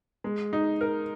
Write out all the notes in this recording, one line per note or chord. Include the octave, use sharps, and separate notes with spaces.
G#3
D#4
A#4